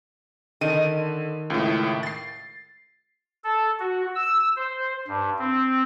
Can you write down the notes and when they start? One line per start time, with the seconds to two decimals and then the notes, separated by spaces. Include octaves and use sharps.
0.61 D3 D#3 D#7
1.50 C#2 A2
2.03 A6 C7
3.44 A4
3.80 F#4
4.16 E6
4.56 C5
5.08 G2
5.39 C4